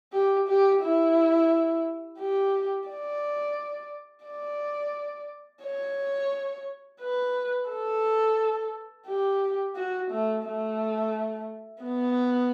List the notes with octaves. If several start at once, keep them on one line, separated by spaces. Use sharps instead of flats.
G4
G4
E4
G4
D5
D5
C#5
B4
A4
G4
F#4
A3
A3
B3